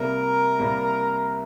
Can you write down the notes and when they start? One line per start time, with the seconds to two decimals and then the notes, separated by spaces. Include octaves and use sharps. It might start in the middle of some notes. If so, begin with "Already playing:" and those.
Already playing: C2 C3 G3 A#3 A#4
0.59 C2 C3 G3 A#3